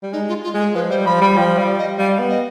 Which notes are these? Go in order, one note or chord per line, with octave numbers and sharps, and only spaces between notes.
G3
G#3 D#4
F4
F4
G#3
G#4
F3 B4
G3 C5
F3 B5
G3 B5
F3 G5
G3 F5
D#5
G3 F5
B3
D#5